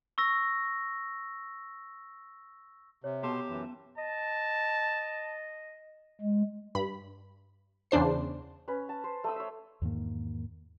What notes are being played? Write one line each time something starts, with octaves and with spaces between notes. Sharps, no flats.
C#6 E6 A#6
C3 C#5
B2 B3 G4 A5 C6 E7
F#2 E3
D#5 A5
G#3
G2 B5
E2 C#3 D4 C5 C7
C#4 B4
A5
C5
A3 D#6 E6
C#5 E5
E2 G#2 D#3 A#3